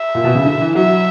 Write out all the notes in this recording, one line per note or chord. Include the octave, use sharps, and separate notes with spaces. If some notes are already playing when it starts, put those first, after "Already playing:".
Already playing: E5
A#2
B2
C#3
D3
E3
F#3 E5